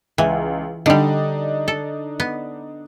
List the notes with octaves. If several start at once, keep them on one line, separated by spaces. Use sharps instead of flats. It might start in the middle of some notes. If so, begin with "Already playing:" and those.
C#2 E3
D3 G3 D4 D#4
A4
B3